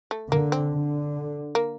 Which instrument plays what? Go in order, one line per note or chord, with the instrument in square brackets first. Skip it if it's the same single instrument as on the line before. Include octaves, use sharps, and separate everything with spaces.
[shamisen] A3
[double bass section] D3 [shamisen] A#3
[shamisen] C4
[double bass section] D3
[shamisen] A#3